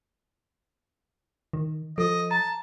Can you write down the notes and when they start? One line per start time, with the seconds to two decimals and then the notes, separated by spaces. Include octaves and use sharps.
1.53 D#3
1.98 F3 A4 D#5
2.31 A5 A#5